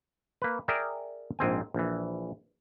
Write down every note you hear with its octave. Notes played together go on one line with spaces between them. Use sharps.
A#3 B4
G#4 A#4 D5 E5 G5
A#1 G#2 C4 G#5
A#1 E3